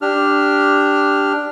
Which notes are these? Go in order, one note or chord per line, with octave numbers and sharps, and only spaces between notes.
D4 G4 F6